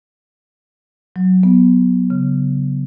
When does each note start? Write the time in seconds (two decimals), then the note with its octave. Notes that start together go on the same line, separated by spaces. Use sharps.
1.16 F#3
1.43 B3
2.10 C#3